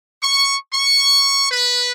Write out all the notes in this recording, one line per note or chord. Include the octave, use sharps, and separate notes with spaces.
C#6
C#6
B4